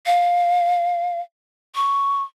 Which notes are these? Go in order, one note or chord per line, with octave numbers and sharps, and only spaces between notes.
F5
C#6